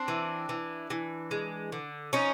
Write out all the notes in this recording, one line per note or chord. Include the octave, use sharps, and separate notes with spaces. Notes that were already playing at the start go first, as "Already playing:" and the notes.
Already playing: C4 D4
E3
E3
E3
G#3
D3
F3 C#4 D#4